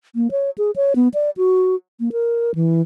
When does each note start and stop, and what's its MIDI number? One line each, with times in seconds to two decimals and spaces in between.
0.15 0.31 58
0.31 0.50 73
0.58 0.71 68
0.76 0.93 73
0.96 1.08 59
1.14 1.30 74
1.37 1.75 66
2.00 2.09 58
2.12 2.51 70
2.55 2.82 52